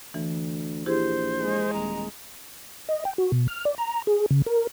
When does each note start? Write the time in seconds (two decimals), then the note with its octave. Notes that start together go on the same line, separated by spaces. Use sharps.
0.14 D2 E3
0.86 A#1 E4 G4 G#4 C5
1.41 G#3
1.73 D#1 A#5
2.89 D#5
3.05 G5
3.18 F#4
3.32 B2
3.48 F6
3.65 D5
3.78 A#5
4.07 G#4
4.31 C#3
4.46 A#4